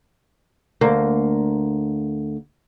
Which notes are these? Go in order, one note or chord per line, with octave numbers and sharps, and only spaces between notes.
D2 A#3